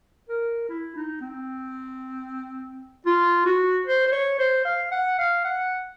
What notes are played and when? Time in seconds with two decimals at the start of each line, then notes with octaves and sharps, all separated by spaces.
0.29 A#4
0.69 E4
0.96 D#4
1.21 C4
3.06 F4
3.46 F#4
3.87 C5
4.07 C5
4.12 C#5
4.39 C5
4.65 F5
4.92 F#5
5.18 F5
5.44 F#5